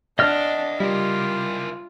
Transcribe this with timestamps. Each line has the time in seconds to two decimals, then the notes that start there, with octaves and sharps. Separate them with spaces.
0.19 D4 D#5 E5 F#5 F6
0.80 G3 E4 F4 A#4